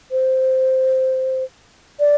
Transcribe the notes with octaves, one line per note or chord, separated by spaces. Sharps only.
C5
D5